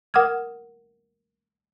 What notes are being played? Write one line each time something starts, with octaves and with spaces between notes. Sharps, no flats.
A#4 F#5 D6 D#6 F6 G#6